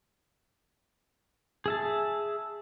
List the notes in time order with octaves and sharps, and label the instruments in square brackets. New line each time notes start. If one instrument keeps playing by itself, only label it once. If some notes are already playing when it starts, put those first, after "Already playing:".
[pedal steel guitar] G#4 E5 A5